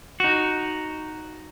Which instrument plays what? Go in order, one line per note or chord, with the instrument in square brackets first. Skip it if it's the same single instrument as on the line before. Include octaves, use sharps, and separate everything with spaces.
[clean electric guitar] D#4 F#4